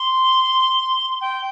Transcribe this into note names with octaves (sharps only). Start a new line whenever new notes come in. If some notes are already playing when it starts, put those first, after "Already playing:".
Already playing: C6
G5